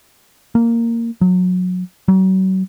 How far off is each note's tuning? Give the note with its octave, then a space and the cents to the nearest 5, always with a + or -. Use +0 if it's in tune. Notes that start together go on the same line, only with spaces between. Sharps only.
A#3 -10
F#3 -25
F#3 +35